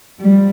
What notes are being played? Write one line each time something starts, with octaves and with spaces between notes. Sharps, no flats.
F3 G3